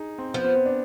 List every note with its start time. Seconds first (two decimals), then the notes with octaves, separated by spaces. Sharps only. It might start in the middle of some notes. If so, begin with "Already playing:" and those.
Already playing: D#4 G#4
0.18 C4
0.34 F3 B3
0.44 B3
0.55 C4
0.66 D4